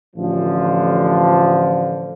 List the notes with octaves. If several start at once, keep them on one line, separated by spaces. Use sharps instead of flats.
A1 D3 F3